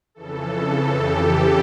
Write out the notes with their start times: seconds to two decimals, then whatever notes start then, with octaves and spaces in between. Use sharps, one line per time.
0.15 F2 C#3 E3 A4
0.54 A4
0.94 G4